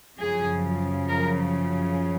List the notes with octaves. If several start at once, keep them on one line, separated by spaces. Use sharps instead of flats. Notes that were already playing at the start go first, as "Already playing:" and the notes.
F#2 C#3 F3 G#4
A#4